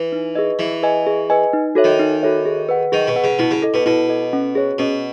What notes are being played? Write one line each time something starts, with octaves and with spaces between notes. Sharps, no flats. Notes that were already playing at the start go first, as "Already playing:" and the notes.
Already playing: E3
D#4
G#4 B4 D#5
E3 G#4
B4 D#5 G#5
G#4
B4 D#5 G#5
D#4
F#4 A4 C#5 E5
D#3
D#4
F#4 A4 C#5 E5
G#4
B4 F#5
D#3 G#4
B2
B4 F#5
C#3
B2 E4
C#3
A4 D#5
B2
B2 E4
A4 D#5
C#4
G#4 C#5
B2 C#4